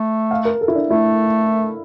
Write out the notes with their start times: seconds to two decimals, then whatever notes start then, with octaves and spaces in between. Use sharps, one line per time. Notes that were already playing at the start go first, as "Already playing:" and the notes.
Already playing: A3
0.31 F5
0.45 A#4
0.61 A4
0.68 E4
0.75 D4
0.90 A3 E4